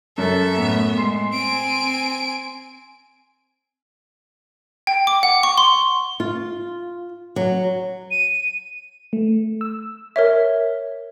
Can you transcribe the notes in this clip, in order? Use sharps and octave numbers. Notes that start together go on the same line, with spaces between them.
F#2 A4 E5
A2 B3
G#3 C6 C7
C4 G#5 D7
G5
D6
F#5
C#6
C6
F4
F#3
D#7
A3
E6
A#4 C#5 E5